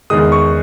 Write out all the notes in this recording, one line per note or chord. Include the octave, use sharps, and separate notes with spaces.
E2 D#3 G#3 D#6
C#6